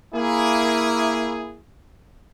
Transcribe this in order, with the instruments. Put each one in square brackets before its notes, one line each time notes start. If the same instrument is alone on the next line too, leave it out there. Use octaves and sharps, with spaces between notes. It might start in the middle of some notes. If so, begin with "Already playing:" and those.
[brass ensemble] A#3 E4 G#4